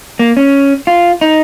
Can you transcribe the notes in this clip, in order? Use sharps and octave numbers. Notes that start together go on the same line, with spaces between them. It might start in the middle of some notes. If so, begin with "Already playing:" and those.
A#3
C#4
F4
D#4